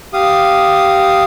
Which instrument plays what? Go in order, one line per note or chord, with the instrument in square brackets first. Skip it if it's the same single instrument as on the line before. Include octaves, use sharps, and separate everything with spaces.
[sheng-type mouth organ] G4 F5 D#6